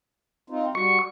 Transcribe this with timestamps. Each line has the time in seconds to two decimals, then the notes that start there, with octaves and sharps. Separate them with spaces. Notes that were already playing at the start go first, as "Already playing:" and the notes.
0.50 C4 D#4 F4
0.75 G3 F#4 C#6